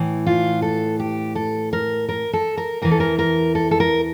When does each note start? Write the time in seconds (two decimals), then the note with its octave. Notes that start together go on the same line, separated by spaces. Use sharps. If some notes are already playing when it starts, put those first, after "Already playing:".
Already playing: A2 E3
0.27 F4
0.62 A4
1.00 G4
1.35 A4
1.73 A#4
2.09 A#4
2.33 A4
2.57 A#4
2.82 E2 E3 A#4
2.91 A4
3.00 A#4
3.19 A#4
3.55 A4
3.71 A4
3.80 A#4